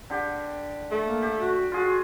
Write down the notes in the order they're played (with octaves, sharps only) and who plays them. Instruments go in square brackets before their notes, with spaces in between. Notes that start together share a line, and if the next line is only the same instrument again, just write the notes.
[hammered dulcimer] D3 G4
[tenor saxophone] A3
[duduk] A#3
[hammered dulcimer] G4
[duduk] F#4
[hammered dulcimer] F4 G#4 [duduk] F#4